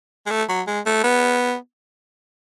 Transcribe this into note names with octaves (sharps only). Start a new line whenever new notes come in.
G#3
A3
F#3
G#3
A3
B3